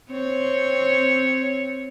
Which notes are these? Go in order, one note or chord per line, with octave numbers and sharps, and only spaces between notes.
C4 C#5